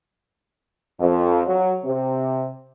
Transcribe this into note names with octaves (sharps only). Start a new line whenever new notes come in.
F2
F#3
C3